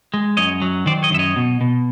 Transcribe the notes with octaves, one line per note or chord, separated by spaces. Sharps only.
G#3
F#2 C#5 D#5
F#3
D#3 C5 D5
C#5 D#5
F#2 E5
C#5 D#5
B2
B2